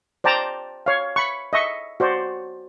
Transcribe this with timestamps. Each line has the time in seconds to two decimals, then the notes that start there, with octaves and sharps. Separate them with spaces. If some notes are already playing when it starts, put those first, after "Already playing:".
0.24 C5 D5 G5 A5 A#5
0.86 C#5 F5
1.16 B5 C#6
1.53 D#5 E5 C#6
2.00 F#4 C5 D5